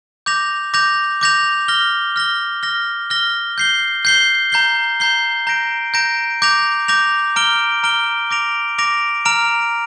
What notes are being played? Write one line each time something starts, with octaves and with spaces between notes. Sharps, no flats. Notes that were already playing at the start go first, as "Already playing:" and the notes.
D6 G6 A#6 F7
D6 G6 A#6 F7
D6 G6 A#6 F7
F6 A#6 G7
F6 A#6 G7
F6 A#6 G7
F6 A#6 G7
G6 C7 G7
G6 C7 G7
A#5 G6 C7 G7
A#5 G6 C7 G7
A#5 G6 A#6 D7
A#5 G6 A#6 D7
D6 G6 A#6 F7
D6 G6 A#6 F7
A#5 F6 D7 G7
A#5 F6 D7 G7
D6 A#6 D7 F7
D6 A#6 D7 F7
A#5 F6 D7 F7